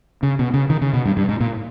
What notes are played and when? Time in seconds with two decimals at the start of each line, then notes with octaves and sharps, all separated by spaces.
0.23 C#3
0.39 B2
0.54 C#3
0.70 D#3
0.82 C#3
0.93 B2
1.05 G2
1.17 G2
1.29 G#2
1.40 A#2